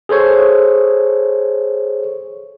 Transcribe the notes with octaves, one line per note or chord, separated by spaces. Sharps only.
G#4 A4 C5 C#5